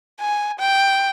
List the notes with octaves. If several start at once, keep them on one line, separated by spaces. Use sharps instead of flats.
G#5
G5